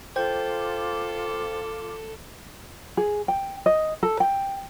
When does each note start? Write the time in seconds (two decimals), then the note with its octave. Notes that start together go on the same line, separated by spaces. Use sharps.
0.16 F4 A4 C5 G5 D6 G6
2.97 G#4
3.28 G5
3.66 D#5
4.03 A4
4.20 G5